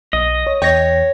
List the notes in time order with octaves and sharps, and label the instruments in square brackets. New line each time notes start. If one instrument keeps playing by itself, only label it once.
[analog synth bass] B1 [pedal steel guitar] D#5
[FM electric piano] C#5
[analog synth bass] E2 [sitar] C#5 [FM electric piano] G5 A#6